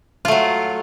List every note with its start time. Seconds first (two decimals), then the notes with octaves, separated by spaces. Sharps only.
0.25 F4
0.28 A3
0.32 F#3